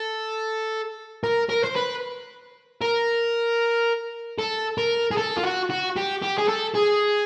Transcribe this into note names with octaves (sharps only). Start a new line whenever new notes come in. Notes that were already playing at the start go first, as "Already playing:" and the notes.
Already playing: A4
A#4
A#4
C5
B4
A#4
A4
A#4
G#4
A4
F4
F#4
F#4
G4
G4
G#4
A4
G#4